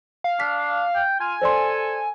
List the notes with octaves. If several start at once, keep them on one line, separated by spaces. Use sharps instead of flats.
F5
D4 B6
G5
F4 G#5
A4 C5 D5 C6